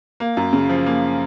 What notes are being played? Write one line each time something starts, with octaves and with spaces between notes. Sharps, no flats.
A#3
F#2
C#3
F3
A#3